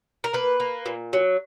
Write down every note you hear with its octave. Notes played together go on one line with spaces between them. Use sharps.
A#4
A#3 B4
A#3
A#2
F#3